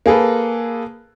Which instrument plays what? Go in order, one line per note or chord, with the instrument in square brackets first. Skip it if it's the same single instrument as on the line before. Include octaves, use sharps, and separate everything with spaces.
[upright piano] A#3 G#4 A4 B4